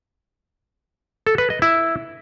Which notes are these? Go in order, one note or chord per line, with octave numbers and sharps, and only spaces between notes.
A4
B4
D#5
E4